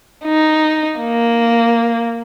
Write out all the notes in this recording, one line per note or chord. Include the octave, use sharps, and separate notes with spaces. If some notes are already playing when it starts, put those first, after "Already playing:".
D#4
A#3